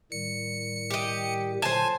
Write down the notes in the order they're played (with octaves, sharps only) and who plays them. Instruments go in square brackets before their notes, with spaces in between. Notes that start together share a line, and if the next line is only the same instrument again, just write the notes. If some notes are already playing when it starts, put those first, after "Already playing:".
[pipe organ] A2 D#3 G3 [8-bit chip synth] C#7
[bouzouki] G4 D#5
[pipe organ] A#2 D3 F#3 [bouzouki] C5 A5 [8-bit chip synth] G#5